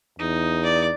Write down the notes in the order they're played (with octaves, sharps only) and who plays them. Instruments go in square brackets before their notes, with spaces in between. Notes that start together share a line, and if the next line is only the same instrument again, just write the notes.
[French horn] E2 [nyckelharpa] D#4
[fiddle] D5